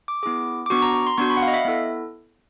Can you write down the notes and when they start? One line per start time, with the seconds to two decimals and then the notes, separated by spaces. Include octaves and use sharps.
0.08 D6
0.23 B3 E4 G#4 D6
0.66 D6
0.70 B3 D4 F#4 C#6
0.82 A#5
1.07 C6
1.18 B3 D4 F#4 C#6
1.30 B5
1.37 F#5
1.42 F5
1.48 D#5
1.54 E5
1.65 B3 E4 A4